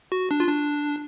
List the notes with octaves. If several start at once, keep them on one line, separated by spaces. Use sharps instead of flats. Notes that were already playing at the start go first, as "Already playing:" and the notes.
F#4
D4
F4
D4